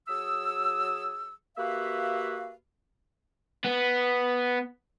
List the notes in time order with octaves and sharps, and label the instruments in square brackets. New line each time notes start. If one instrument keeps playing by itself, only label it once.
[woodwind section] F#3 G#4 D#6 E6
A#3 F#4 G4 B4 E5 F5
[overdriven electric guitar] B3